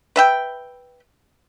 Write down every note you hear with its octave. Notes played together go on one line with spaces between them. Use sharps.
B4 E5 G5